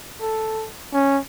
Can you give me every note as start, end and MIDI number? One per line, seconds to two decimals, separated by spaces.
0.21 0.68 69
0.94 1.19 61